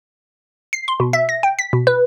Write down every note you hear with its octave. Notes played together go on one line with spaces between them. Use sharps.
C7
C6
B2
E5
A#6
G5
B6
B2
B4